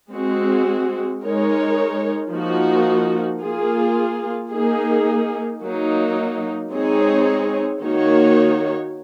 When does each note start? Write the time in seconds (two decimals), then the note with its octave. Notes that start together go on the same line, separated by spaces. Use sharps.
0.11 G#3 C4 F#4
1.22 G#3 D#4 A#4 C#5
2.32 F3 A#3 D#4 F#4
3.42 A#3 F4 G#4
4.51 A#3 D#4 G#4
5.62 F#3 A#3 D#4
6.72 G#3 C4 D#4 G#4 C#5
7.81 D#3 A#3 D#4 F#4 C#5